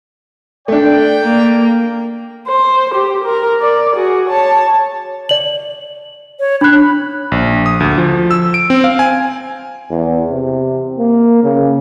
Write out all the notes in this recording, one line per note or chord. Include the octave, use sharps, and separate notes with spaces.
A3 D4 D5 G5
A#3
C5
G4
A#4
D5
F#4 G#4
C#5 A5
D5 F#7
C#5
D4 B5 F#6
A#1
D#6
D2
F3
E6
D7
C4
F5
G#5
E2
C3
A#3
C#3